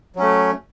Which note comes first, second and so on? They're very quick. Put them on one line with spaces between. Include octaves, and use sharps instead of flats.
F#3 C#4 A3